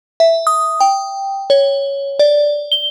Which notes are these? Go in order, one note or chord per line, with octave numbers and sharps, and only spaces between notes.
E5
D#6
G5
C#5
D5
G7